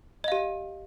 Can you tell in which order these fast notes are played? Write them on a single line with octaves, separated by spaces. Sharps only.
D#5 F5 G4